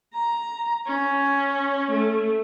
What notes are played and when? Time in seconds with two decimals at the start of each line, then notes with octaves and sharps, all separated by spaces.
0.14 A#5
0.86 C#4
1.91 A3